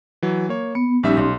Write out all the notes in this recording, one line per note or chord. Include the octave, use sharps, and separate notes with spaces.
E3 F#3
A#3 C#5
B3 C#7
A#1 G3 C#4 D#4 G4 E5
B1 C6